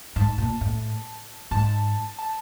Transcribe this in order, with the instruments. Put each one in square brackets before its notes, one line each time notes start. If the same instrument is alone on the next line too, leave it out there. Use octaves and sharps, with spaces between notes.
[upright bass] G#2 [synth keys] A5
[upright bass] A#2
A2
[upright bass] G#2 [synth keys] A5
[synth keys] A5